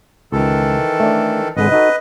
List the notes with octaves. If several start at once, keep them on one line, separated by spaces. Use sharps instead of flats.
C#2 D#3 E3 A4
A3 D4
G#1 D3 G#3 B4 D#5
D#4 F#4 A4